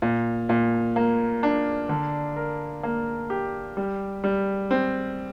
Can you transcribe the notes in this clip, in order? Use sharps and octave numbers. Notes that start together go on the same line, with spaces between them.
A#2
A#2
A#3
D4
D3
A#4
A#3
G4
G3
G3
C4